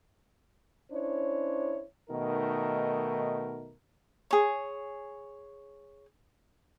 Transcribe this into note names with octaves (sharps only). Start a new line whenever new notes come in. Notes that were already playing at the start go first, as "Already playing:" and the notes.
C#4 D4 E4 C5 C#5
B2 D#3 A3 D#4 A#4
G#4 C#5